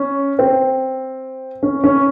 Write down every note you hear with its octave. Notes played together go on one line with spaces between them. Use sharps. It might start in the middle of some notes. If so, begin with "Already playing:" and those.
Already playing: C#4
C4
C#4
C#4